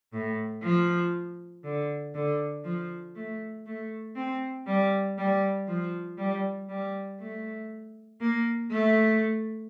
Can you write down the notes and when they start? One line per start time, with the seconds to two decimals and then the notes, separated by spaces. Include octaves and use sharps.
0.13 A2
0.63 F3
1.64 D3
2.15 D3
2.64 F3
3.16 A3
3.66 A3
4.16 C4
4.67 G3
5.18 G3
5.67 F3
6.18 G3
6.69 G3
7.19 A3
8.21 A#3
8.71 A3